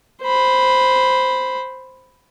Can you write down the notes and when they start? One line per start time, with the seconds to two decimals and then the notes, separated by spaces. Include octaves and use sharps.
0.23 C5 B5